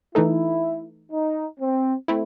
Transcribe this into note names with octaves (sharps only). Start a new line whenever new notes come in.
E3 A3 D#4 E4 A4
D#4
C4
A3 C4 E4